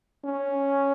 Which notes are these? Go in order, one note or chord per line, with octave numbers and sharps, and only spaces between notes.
C#4